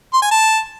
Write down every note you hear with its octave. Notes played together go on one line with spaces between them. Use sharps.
C6
G#5
A5